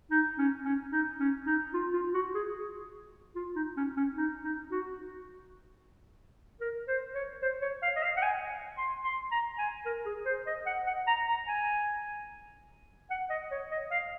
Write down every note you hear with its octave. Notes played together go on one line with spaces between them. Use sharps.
D#4
C#4
C#4
D#4
C#4
D#4
F4
F4
F#4
G#4
F4
D#4
C#4
C#4
D#4
D#4
F#4
A#4
C5
C#5
C5
C#5
F5
D#5
F5
F#5
G#5
C6
C6
A#5
G#5
A#4
G#4
C5
D#5
F#5
F#5
A#5
A#5
G#5
F#5
D#5
C#5
D#5
F5